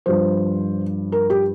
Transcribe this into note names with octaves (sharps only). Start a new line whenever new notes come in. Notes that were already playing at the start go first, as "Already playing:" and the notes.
G2 F3 C5
A#4
G4